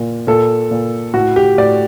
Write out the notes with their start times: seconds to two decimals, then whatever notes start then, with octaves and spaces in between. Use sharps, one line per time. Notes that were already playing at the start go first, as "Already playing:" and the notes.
Already playing: A#2
0.27 A#2 A4
0.71 A#2
1.14 A2 F#4
1.36 G4
1.58 A2 D5